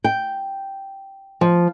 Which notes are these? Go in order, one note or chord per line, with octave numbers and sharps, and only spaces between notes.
G5
F3